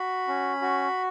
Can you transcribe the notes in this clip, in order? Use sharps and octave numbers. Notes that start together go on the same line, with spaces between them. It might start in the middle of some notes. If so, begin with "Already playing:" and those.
Already playing: F#4 B5
C#4
F#4